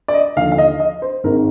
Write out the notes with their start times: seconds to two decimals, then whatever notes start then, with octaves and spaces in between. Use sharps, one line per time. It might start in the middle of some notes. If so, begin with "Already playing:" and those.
0.08 D5
0.14 D#5
0.36 D#2 D3 F3 F5
0.52 F5
0.58 D#5
0.80 D#5
1.02 C5
1.24 G#1 G#2 D#3 G#3 A#4